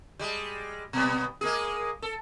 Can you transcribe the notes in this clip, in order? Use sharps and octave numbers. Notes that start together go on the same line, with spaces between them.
G3 G#3
B2 G3 B3
G#3 A#3 G#4
A4